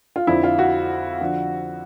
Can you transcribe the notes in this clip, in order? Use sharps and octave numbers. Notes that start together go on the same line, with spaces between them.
F4
F2 D3 F3 E4
F4
F#4
D3 F3